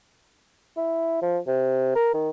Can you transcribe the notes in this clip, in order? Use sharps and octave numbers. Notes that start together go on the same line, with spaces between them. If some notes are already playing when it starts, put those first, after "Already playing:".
E4
F3
C3
A#4
D#3